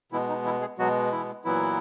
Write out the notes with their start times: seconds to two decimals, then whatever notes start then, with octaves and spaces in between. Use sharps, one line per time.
0.12 B2 E3 G#3 B3 E4
0.29 D#4
0.45 E3 E4
0.61 G#3 G#4
0.78 B2 F#3 G#3 B3 F#4
1.12 E3 E4
1.44 A#2 E3 F#3 B3 E4